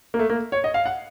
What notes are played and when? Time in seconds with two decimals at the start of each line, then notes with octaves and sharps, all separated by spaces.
0.14 A#3
0.19 A3
0.30 A#3
0.52 C#5
0.64 D#5
0.74 F5
0.86 F#5